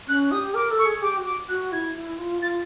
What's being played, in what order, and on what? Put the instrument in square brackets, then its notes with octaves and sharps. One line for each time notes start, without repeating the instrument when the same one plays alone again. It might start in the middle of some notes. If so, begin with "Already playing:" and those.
[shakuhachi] C#4 [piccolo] F#6
[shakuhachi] G4 [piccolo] D#6
[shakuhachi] A#4 [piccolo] D6
[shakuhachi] A4
[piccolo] C#6
[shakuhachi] G#4
[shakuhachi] G4 [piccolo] D6
[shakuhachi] F#4
[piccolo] D6
[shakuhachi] F#4 [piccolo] F#6
[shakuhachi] E4 [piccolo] G#6
[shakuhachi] E4
F4
[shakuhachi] F4 [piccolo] A6